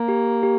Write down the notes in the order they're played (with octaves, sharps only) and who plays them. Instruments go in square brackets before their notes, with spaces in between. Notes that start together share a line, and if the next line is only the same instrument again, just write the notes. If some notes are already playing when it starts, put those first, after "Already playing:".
Already playing: [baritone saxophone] A#3
[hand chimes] G4
G4